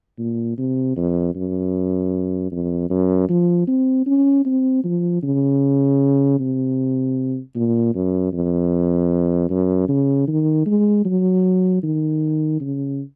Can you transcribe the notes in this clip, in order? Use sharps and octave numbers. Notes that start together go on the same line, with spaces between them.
A#2
C3
F2
F#2
F2
F#2
F3
C4
C#4
C4
F3
C#3
C3
A#2
F#2
F2
F#2
C#3
D#3
G#3
F#3
D#3
C#3